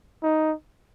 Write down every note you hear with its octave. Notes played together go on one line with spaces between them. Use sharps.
D#4